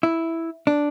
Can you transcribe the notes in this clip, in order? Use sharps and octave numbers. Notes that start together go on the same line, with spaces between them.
E4
D4